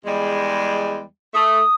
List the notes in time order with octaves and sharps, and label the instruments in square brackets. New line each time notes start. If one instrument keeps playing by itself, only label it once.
[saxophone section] E2 G3 G#3
[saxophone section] A3 [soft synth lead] D#6